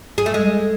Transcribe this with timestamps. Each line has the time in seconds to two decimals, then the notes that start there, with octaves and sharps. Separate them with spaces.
0.18 G#4
0.26 A3
0.34 G#3